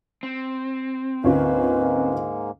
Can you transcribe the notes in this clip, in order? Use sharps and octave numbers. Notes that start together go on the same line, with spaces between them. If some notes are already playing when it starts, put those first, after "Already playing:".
C4
D2 G#2 G#3 A#3 C#4 F4 B4